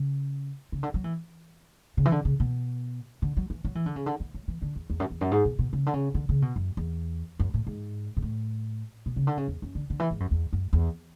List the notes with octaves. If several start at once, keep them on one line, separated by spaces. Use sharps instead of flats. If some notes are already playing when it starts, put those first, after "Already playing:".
Already playing: C#3
C#3
D3
F#3
E3
C#3
E3
D3
C#3
B2
D3
F#3
E3
F#3
E3
D3
C#3
D3
E3
F#3
E3
D3
E2
E2
F#2
E2
F#2
G#2
B2
B2
C#3
D3
C#3
D3
C#3
B2
F#2
E2
F#2
A2
G#2
G#2
A2
B2
C#3
D3
C#3
E2
F#2
D3
D3
E3
G#2
F#2
E2
F#2
E2